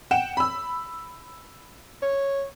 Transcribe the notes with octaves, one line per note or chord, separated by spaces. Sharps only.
F#5 G5 E7
B5 E6
C#5